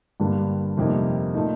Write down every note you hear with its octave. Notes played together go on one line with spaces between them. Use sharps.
G2 D3 G3 A#3 D4
F2 C3 G3 A#3 D#4
A#2 A3 D#4